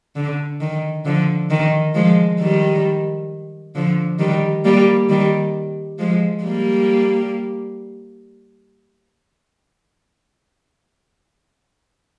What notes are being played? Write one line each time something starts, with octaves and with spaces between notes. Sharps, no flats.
D3
D#3
D3 F3
D#3
F3 G#3
D#3 G3
D3 F3
D#3 G3
G3 A#3
D#3 G3
F3 G#3
G3 A#3